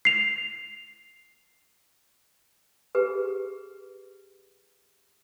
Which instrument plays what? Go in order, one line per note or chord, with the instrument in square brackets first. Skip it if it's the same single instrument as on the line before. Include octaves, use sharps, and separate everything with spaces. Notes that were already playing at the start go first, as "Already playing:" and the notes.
[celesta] C7 F7
[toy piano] G4 G#4 B4